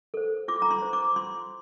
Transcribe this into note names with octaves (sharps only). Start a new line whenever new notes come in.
A4 C5
F4 D6
A#5
C6
C5
D6
F4 C6